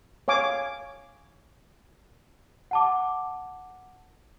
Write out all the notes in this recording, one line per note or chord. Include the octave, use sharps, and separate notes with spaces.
C#5 F5 G#5 D6
F#5 A5 D6